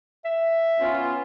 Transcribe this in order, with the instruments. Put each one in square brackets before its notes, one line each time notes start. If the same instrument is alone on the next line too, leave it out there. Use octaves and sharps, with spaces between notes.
[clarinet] E5
[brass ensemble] B3 C#4 F4